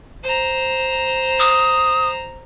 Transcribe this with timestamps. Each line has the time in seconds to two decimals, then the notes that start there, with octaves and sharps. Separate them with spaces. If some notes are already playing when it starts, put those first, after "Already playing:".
0.23 C5 A#5
1.40 D#6